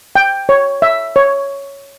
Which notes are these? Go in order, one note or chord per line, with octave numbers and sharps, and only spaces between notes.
G5
C#5
E5
C#5